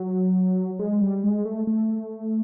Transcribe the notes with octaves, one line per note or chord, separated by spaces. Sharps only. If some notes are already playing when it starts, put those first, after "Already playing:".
Already playing: F#3
G#3
G3
G#3
A3
A3